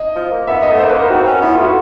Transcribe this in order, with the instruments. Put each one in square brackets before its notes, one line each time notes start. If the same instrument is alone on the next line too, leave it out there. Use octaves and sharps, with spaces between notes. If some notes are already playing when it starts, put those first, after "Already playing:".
Already playing: [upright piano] D#5
[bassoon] F3
A#3
[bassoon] B3 [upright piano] E5
[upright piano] D#5
[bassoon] A3
[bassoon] A#3 [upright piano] C5
[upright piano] B4
[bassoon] B3 [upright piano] A#4
[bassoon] C4 [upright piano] F#4
[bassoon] C#4
[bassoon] B3 [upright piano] E4
[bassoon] A3 [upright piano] F4
[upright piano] F#4